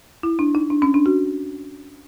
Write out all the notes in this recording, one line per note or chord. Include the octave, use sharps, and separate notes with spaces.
E4
D4
D#4
D4
C#4
D4
F#4